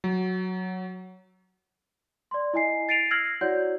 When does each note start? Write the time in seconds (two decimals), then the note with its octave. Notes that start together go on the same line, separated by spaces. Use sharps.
0.04 F#3
2.31 D5 C6
2.54 E4 D#5 G#5 C7
2.89 A6 C7 D7 D#7 F7
3.11 E6 F6 G#6 A#6 C7 F#7
3.41 E4 F#4 C#5 D5 F#5 G6